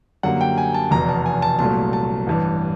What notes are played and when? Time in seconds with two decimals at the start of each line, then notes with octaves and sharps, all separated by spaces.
0.23 F#2 D3 G3 A#3 F#5
0.41 G5
0.58 G#5
0.74 A5
0.91 F1 E2 B2 A#5
1.09 A5
1.26 G#5
1.42 A5
1.59 C2 A#2 F#3 A3 A5
1.93 A5
2.27 A1 G2 E3